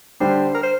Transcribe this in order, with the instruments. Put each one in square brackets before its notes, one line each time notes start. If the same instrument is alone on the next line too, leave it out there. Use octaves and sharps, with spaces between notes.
[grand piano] D3 G3 D4 G4 [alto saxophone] C5
[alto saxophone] A#4
C5